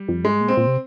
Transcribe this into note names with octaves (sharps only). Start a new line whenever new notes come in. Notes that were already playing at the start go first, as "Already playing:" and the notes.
Already playing: G3
F2
G#2 G#3
A#2
C4
A#2
C3